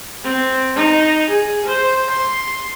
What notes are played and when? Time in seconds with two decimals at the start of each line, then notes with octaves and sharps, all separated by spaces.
0.24 C4
0.76 D#4
1.30 G#4
1.66 C5
2.11 C6